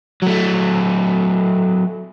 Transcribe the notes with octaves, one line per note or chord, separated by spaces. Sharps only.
F#3 A3